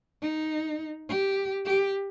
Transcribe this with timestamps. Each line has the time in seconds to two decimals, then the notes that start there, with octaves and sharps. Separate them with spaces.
0.22 D#4
1.09 G4
1.66 G4